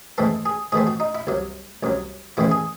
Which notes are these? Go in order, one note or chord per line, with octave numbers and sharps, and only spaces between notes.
G#2 E3 A3 C4 A4
G#4
G#2 E3 A3 C4 G#4
F#4
D#4
E4
C2 C3 F#3
C2 C3 F#3
A1 G#2 E3 C4 E4
G#4